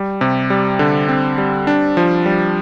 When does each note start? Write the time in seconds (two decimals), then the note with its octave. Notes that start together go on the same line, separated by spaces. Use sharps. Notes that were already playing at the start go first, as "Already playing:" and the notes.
Already playing: G3
0.21 C3
0.50 G3
0.79 D3
1.08 C4
1.38 G3
1.67 D4
1.97 F3
2.26 G3